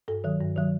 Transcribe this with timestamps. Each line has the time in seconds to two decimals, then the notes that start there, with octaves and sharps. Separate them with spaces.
0.08 G2 A4
0.24 D#3 F#3
0.40 G2
0.56 D#3 F#3